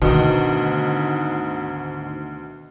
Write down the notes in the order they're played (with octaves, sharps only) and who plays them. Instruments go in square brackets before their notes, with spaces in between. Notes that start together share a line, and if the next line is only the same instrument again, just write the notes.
[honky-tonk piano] D2 [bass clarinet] G#2 [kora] B2 D#3 [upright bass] D#4